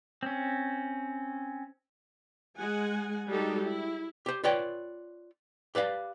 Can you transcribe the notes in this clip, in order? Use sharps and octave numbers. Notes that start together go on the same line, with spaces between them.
C4 C#4
G#3 F#5 G#5
G3 G#3 D#4 F#4 G4 A4
E4
G4 C5
F4 B4 C#5 D5 G5
G4 B4 D5 F5